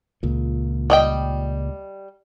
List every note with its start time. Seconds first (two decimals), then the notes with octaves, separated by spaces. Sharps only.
0.23 C#2 A#2
0.90 G3 D#5 G5